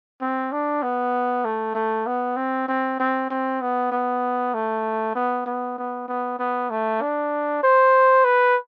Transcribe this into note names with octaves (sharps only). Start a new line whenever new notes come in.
C4
D4
B3
A3
A3
B3
C4
C4
C4
C4
B3
B3
A3
B3
B3
B3
B3
B3
A3
D4
C5
B4